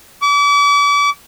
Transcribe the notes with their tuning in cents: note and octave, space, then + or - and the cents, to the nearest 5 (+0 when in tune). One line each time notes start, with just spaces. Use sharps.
D6 -40